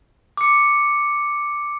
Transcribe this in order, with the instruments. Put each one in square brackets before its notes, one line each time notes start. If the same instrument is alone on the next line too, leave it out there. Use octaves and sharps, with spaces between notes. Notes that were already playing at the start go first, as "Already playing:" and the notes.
[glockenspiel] D6 C#7